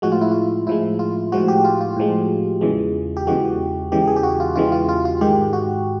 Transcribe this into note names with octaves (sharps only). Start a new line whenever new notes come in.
A2 F3 G#3 F#4
F4
E4
F4
A2 F3 G#3 E4
F4
A2 F3 G#3 F#4
G4
F4
F4
A2 F3 G#3
E2 C#3 E3 G#3
G4
E2 C#3 E3 G#3 F#4
E2 C#3 E3 G#3 G4
G#4
G4
F#4
F4
E2 C#3 E3 G#3 F4
F4
F4
F4
G#2 D#3 G#3 G4
F#4